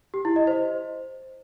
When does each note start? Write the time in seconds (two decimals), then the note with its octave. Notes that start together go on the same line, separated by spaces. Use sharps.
0.14 G4
0.25 E4
0.36 D#5
0.47 C5